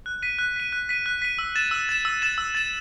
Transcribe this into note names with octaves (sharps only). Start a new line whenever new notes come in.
F#6
B6 D#7
F#6
B6 D#7
F#6
B6 D#7
F#6
B6 D#7
E6
A6 E7
E6
A6 E7
E6
A6 E7
E6
A6 E7